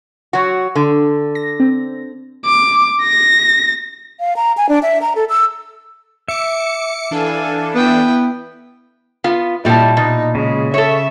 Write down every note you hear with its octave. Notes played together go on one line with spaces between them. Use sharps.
F#3 F#4
D3
A#6
C4
D6
A#6
F5
A#5
G#5
D4
E5
A#5
A4
E6
E5 D6 C#7
E3 D4 A4 F5 G#5
B3 E4 G5
B3 F4
A#2 G3 E4 D5 D#5 A5
B2 D#4
C#3 G#3
A4 C#5 E5